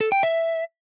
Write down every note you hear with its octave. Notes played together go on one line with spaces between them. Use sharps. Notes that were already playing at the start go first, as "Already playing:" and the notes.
A4
G5
E5